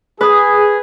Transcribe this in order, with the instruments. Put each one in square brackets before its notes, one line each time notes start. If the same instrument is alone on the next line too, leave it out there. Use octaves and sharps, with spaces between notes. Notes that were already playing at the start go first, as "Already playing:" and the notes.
[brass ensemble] G#4 [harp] B4 D#6